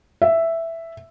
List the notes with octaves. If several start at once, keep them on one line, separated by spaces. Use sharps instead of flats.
E5